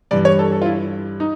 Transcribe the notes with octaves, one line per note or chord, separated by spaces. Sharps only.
G2 E3 G3 D5
C#5
A4
A4
F4
E4
D#4